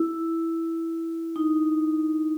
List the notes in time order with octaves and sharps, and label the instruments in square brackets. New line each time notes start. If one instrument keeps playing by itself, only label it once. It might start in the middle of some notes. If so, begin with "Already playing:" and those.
Already playing: [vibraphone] E4
D#4